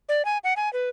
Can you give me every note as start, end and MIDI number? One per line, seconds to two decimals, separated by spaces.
0.09 0.25 74
0.25 0.38 80
0.44 0.54 78
0.57 0.71 80
0.73 0.89 71